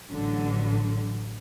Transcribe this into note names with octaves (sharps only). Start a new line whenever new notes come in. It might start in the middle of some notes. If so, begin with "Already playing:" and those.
A1 D3 F#3